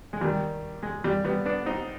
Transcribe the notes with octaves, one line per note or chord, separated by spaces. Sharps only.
G#3
D#2 D#3 G3
G#3
G3
G3 B3
B3 D4
C4 D#4